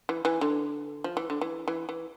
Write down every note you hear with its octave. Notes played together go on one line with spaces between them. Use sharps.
E3
E3
D3
F3
E3
D3
E3
E3
E3